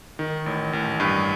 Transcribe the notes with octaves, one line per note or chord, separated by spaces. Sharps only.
D#3
A1
A1
G2